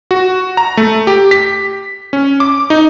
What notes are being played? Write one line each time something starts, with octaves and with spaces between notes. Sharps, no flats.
F#4
A#5
A3
G4
B6
C#4
D6
D#4